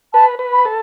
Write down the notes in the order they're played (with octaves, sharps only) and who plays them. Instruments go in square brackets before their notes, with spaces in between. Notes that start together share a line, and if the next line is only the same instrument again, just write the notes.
[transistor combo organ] B4 [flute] A5
[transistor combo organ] B4
[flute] B5
[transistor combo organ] A4